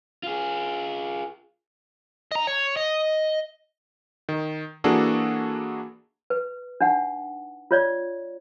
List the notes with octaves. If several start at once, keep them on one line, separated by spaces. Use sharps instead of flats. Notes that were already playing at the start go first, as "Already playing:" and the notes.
F4 G#4
D#5 A#5
C#5
D#5
D#3
E3 A#3 D4 F#4 G#4 A4
B4
D4 D#4 F#5
F4 C#5 D5